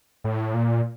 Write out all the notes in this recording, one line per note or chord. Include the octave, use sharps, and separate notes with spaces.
A2
A#2